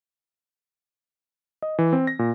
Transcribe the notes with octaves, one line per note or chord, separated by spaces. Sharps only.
D#5
E3
C4
A#6
A#2